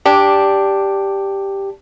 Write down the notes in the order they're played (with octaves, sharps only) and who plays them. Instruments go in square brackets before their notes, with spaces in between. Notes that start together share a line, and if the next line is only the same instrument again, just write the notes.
[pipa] D4 [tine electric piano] G4